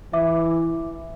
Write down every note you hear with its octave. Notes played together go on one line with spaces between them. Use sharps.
E3 E5 D6